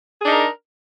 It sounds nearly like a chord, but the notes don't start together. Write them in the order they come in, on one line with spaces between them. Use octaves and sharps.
G#4 D4 D#4 A#4